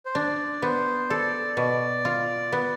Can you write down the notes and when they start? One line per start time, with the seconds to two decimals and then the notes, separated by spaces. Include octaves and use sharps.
0.06 C5
0.15 D4 D5
0.62 B3 C5
1.10 A4 D5
1.57 B2
2.05 F4
2.52 B3